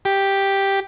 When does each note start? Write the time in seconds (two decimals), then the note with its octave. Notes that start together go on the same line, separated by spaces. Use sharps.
0.05 G4